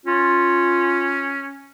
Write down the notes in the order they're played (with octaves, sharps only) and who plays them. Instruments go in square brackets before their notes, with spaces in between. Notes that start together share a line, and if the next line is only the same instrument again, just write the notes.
[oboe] C#4 [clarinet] F4